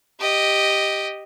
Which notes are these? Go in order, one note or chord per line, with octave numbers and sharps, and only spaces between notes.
G4 D#5